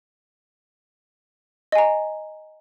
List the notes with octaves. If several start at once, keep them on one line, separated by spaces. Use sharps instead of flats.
D#5 G#5 A#5